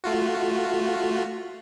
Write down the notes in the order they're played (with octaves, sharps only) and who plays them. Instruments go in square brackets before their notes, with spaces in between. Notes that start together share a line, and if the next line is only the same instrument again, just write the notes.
[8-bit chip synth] A3 F4 F#4